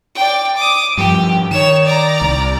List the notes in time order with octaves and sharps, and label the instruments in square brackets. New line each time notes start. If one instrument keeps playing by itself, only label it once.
[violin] D5 G5
D6 D#6
[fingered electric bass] G2 F3 [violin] G4
[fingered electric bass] D#3 [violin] C#5 E7
[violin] D5 A#5
[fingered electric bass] C2